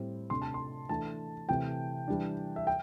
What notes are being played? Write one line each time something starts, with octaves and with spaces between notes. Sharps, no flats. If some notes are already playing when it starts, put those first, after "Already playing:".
Already playing: A2 G3 C4
C3 A3 D4 C6
A5
C6
E3 A3 D4 A5
C3 E3 A3 G5
E3 G3 D4
E5
G5